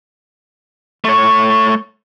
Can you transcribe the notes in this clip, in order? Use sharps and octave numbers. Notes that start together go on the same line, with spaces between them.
A3 C#5